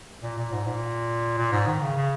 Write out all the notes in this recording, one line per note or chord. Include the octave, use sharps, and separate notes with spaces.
A#2
A#2
G#2
A#2
A#2
G#2
D#3
C#3
C#3